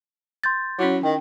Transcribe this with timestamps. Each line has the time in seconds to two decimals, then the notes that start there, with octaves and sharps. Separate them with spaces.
0.44 C6 G6 A6
0.79 F#3 C#4 E4
1.03 D#3 G5